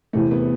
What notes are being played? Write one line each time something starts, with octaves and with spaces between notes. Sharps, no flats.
E2 C3 E3 A3
B3